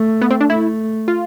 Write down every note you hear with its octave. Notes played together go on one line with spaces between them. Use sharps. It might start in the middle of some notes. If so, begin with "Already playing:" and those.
Already playing: A3
B3
C4
D4
A3 E4
F4